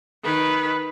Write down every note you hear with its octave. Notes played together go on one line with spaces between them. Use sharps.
D#3 B4